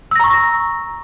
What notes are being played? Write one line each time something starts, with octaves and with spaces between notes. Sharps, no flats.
A#5 C#6 E6 A#6